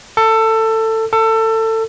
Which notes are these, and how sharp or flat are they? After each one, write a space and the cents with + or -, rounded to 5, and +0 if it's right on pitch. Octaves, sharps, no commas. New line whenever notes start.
A4 +20
A4 +25